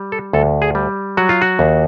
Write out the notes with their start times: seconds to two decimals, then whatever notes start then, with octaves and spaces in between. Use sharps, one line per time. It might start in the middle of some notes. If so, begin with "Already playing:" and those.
Already playing: G3
0.12 A4
0.33 D2 A4
0.62 G#4
0.75 G3
1.17 F#3 F#4
1.29 F4
1.42 F#4
1.59 D#2